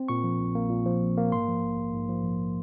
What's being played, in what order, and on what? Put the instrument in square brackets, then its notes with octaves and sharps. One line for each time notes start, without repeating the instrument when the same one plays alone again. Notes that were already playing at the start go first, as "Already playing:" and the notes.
Already playing: [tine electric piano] C4
A#2 C#6
F3
A#1
A#3
A#2
F3
A#1
A#3
G#2 C6
F3
A#1
A#1
G#2
F3
A#1